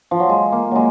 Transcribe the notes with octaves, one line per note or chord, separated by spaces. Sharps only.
F3
F#3
G#3
A#3
F#3 G#3